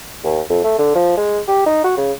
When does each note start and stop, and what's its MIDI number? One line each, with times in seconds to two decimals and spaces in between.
0.24 0.41 39
0.50 0.60 41
0.64 0.74 57
0.79 0.92 50
0.95 1.13 53
1.17 1.40 56
1.48 1.64 67
1.66 1.83 63
1.84 1.94 66
1.97 2.12 49